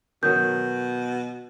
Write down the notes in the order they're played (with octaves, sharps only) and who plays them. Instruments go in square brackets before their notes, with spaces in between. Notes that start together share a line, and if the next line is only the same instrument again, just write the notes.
[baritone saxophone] B2 [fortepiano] D#3 F#3 [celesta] G6